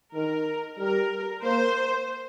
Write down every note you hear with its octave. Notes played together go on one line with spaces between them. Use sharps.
D#3 A#4
G3 A#4
A#3 C5